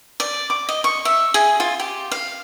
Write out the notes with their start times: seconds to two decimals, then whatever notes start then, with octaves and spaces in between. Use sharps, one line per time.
0.20 D5
0.50 D6
0.69 D#5
0.84 C#6
1.05 E5
1.34 G#4
1.60 F4
1.80 G4
2.11 F5